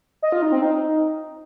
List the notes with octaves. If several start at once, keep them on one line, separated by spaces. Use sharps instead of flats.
D#5
F4
D#4
C4
D#4